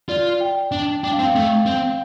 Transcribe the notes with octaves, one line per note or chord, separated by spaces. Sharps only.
F4 D5
G5
D4
D4 G5
F5
C4 G5
A3
C4